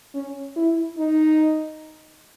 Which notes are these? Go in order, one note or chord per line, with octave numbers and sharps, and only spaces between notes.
C#4
E4
D#4